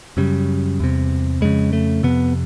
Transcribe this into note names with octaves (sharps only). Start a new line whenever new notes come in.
F#2 C#3 G3
E2 C3
F2 C#3 G#3
A3
F2 C3 B3